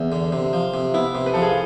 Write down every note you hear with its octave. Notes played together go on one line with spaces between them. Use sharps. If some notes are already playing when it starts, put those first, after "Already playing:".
Already playing: E2
D3
C3
F3
C3
B3 E4
C3
B4
F3 A4
G#4
F4